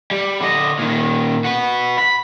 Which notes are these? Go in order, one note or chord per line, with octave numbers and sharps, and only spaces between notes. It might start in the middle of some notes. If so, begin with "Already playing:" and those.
G3
D3 D#5
A#2 D#3
F#4 B4
B5